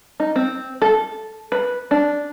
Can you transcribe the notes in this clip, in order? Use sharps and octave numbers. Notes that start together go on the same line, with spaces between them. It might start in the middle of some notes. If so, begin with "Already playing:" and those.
D#4
C4
A4
B4
D4